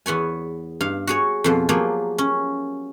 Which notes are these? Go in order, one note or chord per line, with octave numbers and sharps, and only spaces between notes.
E2 B3 C#5 G#5
G2 F5
F#4 G#4 C#5
F2 B2 F3
F3 F#3 A#3 G4 G#4
C#4